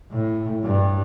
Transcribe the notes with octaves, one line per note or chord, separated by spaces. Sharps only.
A2
G2